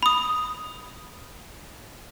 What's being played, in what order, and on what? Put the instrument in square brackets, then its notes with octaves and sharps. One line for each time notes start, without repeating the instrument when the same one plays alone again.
[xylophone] B5 D#6